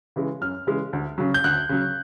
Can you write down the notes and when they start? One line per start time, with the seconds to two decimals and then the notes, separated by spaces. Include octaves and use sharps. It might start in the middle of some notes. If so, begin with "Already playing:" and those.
0.16 C#3 E3 G#3
0.41 F#2 F6
0.67 C#3 E3 G#3
0.93 D2
1.18 C#3 F#3
1.34 G6
1.44 D2 F#6
1.69 C#3 F#3